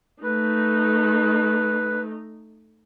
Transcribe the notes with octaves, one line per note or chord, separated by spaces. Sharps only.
A3 D#4 B4